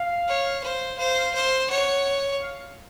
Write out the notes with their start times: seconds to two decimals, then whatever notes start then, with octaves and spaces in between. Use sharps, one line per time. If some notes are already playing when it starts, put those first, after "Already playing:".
Already playing: F5
0.27 C#5
0.63 C5
0.98 C5 F5
1.34 C5
1.70 C#5 F#5
2.41 F5